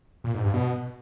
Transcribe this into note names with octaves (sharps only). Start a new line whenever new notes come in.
A#2
G#2
G2
B2